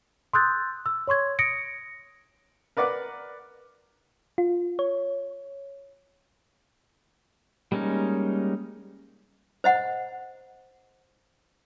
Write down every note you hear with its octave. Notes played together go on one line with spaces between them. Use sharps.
C6 D#6 E6 F#6 G6 A6
E6
C#5 C6 C#6 G#6
D#6 A#6 C#7 D7
A#4 B4 D5 F#5 D6
F4
C#5
G3 G#3 A#3 C#4 D#4
C5 D#5 F#5